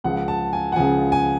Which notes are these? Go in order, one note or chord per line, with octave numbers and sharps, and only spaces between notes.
C#2 C#3 F3 F#5
A5
G#5
F#5
C#2 C#3 F3 G#5
G#5